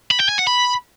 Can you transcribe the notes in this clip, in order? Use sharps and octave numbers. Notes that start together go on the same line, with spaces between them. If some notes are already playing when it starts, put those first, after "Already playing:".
B5
G5
G#5
F#5
B5